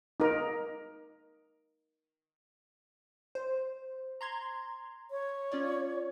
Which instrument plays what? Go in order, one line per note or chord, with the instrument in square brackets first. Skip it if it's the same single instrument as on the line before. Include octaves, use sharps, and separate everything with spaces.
[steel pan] D#4 A#4
[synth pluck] C5
A#5 C6 G#6
[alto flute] C#5
[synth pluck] C#4 F4 D5